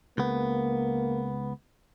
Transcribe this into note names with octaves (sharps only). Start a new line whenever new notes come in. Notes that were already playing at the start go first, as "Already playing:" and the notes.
C#2 A#3 B3